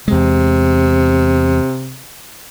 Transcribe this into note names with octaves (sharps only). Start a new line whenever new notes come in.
E2 C3 G#3